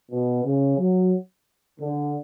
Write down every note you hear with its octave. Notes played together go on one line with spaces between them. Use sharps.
B2
C#3
F#3
D3